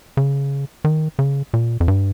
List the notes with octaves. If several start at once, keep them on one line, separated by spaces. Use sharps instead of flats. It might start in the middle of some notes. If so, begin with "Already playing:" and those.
C#3
D#3
C#3
A#2
F2
G2